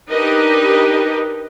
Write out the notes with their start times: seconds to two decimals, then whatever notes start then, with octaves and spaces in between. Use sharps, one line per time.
0.11 D4 D#4 G4 A#4 B4 D#5